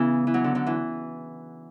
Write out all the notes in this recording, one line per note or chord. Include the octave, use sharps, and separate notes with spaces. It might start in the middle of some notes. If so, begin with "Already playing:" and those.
Already playing: C#3 E3 B3
E3
F#3
D3
D3
E3